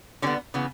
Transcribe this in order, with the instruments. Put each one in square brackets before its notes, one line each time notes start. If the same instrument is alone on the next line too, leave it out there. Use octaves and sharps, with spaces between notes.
[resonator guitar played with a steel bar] D3 G3 B3 C#4
C#3 E3 B3